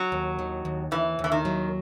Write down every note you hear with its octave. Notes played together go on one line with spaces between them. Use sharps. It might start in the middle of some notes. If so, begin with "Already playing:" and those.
Already playing: F#3
D#2
D#3
D#2
D#2 E3
D#2
E3
D#3
F#3